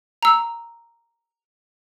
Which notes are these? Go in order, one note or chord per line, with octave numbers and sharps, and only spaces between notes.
A#5 E6